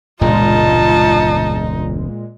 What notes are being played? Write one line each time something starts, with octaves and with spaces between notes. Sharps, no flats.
E1 C#2 G2 A#2 G#3 D#4 F4 A5